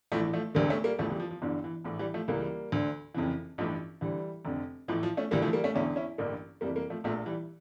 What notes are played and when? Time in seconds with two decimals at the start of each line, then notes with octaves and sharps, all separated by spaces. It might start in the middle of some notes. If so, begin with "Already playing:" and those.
0.12 A#1 A2 E3 F3 A3
0.33 F3 A3
0.55 E1 D2 D3 G3 A#3
0.69 A3 C#4
0.84 G3 A#3
0.98 E1 D2 C#3 E3 F3 A3
1.10 E3 G3
1.20 F3
1.31 F3
1.42 G1 G2 D3 E3
1.64 E3
1.85 A#1 A2 E3
1.99 E3 G3
2.14 F3 A3
2.28 C#2 C#3 E3 G3 A#3
2.72 D2 D3
3.14 F1 F2 C#3 E3
3.58 A1 G2 E3 F3 A3
4.01 D2 D3 E3 G3
4.45 F1 F2 D3
4.88 A1 A2 E3 F3
5.03 F3
5.17 A3 C#4
5.31 D2 C#3 E3 G3 A#3
5.42 F3 A3
5.53 G3 A#3
5.64 A3 C#4
5.74 E1 E2 D3 C#4 E4
5.96 C#4 E4
6.18 A1 G2 D3 A#3 D4
6.61 F1 F2 E3 G3 A#3
6.76 G3 A#3
6.90 F3 A3
7.04 A#1 A#2 F3 A3
7.26 E3 G3